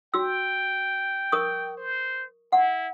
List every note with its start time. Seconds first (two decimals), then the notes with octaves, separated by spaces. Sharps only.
0.14 F#4 G5 E6
1.32 A#4 C#6 D#6
1.77 C5
2.52 E4 F#5